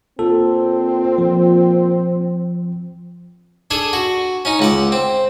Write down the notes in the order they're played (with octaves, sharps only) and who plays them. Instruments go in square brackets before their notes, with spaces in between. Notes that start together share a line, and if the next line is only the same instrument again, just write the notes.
[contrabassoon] A#2 [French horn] C4 [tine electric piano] A4
[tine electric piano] F3
[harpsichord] D4 G#4 A4 G#5
F#4
C#4 D#4
C#2 F#5 D6
C4